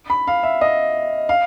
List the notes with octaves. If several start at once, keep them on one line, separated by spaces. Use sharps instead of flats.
B5
F5
E5
D#5
F5